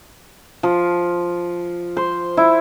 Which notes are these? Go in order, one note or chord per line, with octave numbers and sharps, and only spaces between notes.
F3
C5
E4